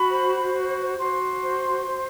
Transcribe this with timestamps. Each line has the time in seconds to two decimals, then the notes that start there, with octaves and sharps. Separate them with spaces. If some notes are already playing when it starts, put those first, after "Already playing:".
Already playing: F#4 B5
0.10 C5
0.53 F#4
0.98 F#4 C6
1.43 C5
1.87 C5